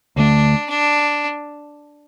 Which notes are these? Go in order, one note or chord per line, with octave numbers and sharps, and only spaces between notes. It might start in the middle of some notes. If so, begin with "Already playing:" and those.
D2 D3 A3 D4
D4